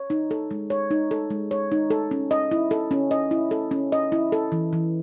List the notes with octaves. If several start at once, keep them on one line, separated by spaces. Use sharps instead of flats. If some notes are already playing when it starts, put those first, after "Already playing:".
Already playing: C#5
D#4
A4
G#3
C#5
D#4
A4
G#3
C#5
D#4
A4
C#4
D#5
E4
A4
C#4
D#5
E4
A4
C#4
D#5
E4
A4
E3
E3